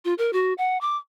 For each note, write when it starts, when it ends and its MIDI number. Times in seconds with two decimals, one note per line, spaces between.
0.05 0.14 65
0.18 0.31 70
0.33 0.53 66
0.58 0.80 78
0.81 0.96 86